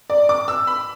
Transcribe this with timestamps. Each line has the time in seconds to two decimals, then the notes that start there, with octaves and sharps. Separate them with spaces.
0.10 D5
0.29 D6
0.48 E6
0.67 B5